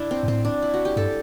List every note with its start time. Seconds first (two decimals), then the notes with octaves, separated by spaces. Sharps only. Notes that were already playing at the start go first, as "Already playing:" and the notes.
Already playing: D4 E4
0.11 C4
0.23 G2
0.28 A2 C4
0.45 D4
0.62 E4
0.74 F#4
0.85 G4
0.97 G2 A4